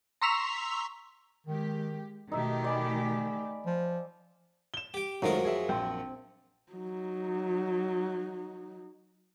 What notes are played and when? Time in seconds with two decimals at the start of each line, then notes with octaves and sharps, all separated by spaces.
0.21 A#5 C6 C#6 E6 B6 F7
1.47 D#3 G#3 G4
2.32 B2 D#3 A3 D#4 G4 E5
2.64 D5 G#5 B5
3.66 F3
4.74 E7 G7
4.94 G4 G5
5.22 F#2 D#3 F3 F#3 G#3 A3 A#4
5.45 G#4 E5
5.69 A#1 C4
6.72 F#3 D#4